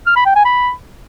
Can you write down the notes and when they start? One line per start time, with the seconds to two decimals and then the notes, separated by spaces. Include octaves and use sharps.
0.06 F6
0.16 B5
0.26 G5
0.35 G#5
0.45 B5